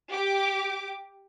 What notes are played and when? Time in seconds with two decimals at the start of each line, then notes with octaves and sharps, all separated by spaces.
0.11 G4 D6